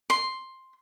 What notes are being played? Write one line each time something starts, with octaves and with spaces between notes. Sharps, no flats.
C6